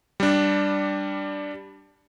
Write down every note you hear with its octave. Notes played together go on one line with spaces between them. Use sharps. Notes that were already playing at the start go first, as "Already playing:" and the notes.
G3 D4